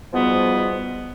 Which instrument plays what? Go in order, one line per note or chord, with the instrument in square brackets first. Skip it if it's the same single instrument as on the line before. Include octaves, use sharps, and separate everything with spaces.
[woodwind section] G#2 B2 F3 G3 B3